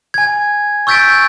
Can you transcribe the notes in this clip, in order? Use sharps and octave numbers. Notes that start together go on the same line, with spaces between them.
G#5 G#6
C#6 E6 G6 A6 B6 D7